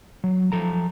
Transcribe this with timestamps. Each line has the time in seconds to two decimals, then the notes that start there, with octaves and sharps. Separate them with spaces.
0.24 F#3
0.52 F3 A4 A#5